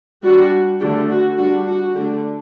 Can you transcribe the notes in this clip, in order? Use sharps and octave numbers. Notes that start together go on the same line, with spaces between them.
G3 D4 F#4
D3 A3 D4 G4
F#4
G3 D4 F#4
F#4
D3 A3 D4 G4